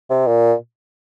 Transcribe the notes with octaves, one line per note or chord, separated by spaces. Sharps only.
C3
A#2